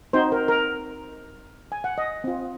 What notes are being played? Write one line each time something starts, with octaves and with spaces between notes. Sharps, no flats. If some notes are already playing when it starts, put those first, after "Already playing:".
C4 D#4 F#4 C5
A#4
A#4
G#5
F#5
D#5
C4 F4